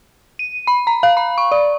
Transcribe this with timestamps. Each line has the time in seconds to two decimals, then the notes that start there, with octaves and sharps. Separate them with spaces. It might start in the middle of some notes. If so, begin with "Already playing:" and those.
0.39 D#7
0.67 B5
0.87 A#5
1.03 F5
1.17 B5
1.38 C#6
1.52 D5